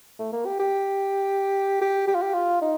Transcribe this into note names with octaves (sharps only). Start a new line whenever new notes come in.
A3
A#3
G4
G4
G4
G4
F4
G4
F4
D#4